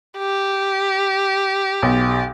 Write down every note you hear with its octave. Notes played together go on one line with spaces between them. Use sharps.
G4
B1